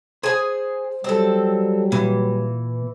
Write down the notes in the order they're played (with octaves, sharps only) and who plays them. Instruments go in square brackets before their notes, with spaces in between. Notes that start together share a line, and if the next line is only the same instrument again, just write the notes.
[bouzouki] G#4 G#5 [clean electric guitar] C5
[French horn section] F#3 G3 [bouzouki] C4 A4
[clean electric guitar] A#2 [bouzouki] E3